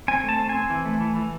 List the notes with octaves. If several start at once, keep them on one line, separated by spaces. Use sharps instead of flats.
C4 G#5
A3
A5
C4
G#5
C4
E3
A3
E3
E3